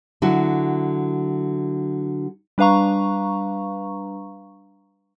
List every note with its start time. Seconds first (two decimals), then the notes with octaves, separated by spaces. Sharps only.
0.22 D3 F#3 E4 F#4
2.58 G3 D4 B4 F5 A#5 C#6